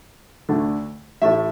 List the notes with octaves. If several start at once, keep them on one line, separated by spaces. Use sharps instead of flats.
D2 D3 A3
A1 A2 A3 E5